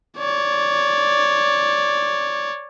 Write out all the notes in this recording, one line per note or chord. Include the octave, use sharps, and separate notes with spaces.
C#5 D5